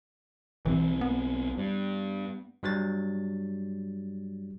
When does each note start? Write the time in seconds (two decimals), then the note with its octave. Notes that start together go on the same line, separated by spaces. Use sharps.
0.65 B1 E3 F#3 C4
1.01 B3
1.58 G2
2.63 G2 F#3 G3 A6